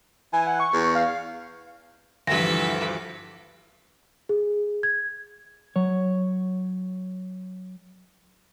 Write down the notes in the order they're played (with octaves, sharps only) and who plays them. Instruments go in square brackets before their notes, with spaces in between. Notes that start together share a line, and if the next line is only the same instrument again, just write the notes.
[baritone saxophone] E3 [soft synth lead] G#5
[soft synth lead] F#5
C#6
[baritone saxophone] E2
[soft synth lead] F5
[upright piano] D2 G2 [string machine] E3 F3 D6 [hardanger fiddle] A4 B4 [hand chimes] A#6
[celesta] G#4
G#6
[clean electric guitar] F#3 C#5